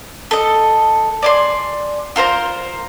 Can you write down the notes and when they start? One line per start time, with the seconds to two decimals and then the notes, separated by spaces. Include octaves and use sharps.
0.31 A4 D#5
1.22 D5 G#5 C6
2.16 F4 A#4 C5 A#5